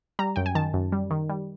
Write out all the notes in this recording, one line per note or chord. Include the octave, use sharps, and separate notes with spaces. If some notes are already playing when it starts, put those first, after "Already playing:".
G3 A#5
F#2 G5
G#5
D#3 A5
F#2
G3
D#3
G3